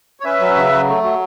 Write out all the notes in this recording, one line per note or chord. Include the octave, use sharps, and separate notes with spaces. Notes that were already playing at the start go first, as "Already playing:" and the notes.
C#5
C#4 B4 E5
F#3
C#3
F#3
A3
F#3